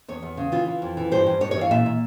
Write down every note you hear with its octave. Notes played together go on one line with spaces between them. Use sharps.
E2 C#5
E2
C#3
E3 F4
E3
F2
E3
G2 C5
G2
G2 C#5
C#5
E3 F5
A#2 E5
A#2